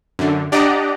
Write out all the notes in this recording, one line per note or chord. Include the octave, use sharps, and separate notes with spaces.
F#2 D3
D4 G4 D5 D#5 F#5 A#5